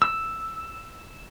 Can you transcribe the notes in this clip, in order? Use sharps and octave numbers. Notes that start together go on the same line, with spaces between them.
E6